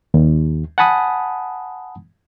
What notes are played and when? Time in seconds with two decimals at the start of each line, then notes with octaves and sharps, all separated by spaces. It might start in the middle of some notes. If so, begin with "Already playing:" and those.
0.14 D#2
0.78 F#5 G#5 A5 B5 D#6